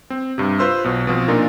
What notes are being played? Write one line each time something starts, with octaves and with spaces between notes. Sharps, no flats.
C4
G2 C3
F4 B4 C5 C6 E6
B1 B2
B2 F3 C4
A#2 D4 D#4 F4 A#4